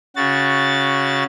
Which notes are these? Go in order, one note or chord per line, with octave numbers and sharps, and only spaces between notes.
C#3 F#4 A6